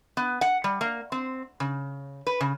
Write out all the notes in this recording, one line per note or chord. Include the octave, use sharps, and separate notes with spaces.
B3
F#5
G3
A#3
C4
C#3
B4
C#3